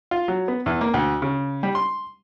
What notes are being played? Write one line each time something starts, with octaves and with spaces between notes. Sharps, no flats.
F4
F#3
B3
E2
A#3
D2
C#3
G3
C6